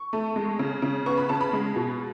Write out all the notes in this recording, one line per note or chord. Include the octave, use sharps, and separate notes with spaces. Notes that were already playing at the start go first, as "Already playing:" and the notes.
Already playing: C#6
A3
G#3
C#3
C#3
B3 C#6
B5
C#3 A5
B5
G#3
B2